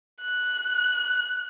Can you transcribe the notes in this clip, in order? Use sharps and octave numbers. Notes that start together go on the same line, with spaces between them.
F#6